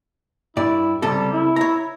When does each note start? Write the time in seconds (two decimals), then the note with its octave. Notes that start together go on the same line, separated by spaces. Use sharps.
0.57 G2 E4 D5
1.02 C#2 C3 G3 A4
1.32 E4
1.56 C#5 A#5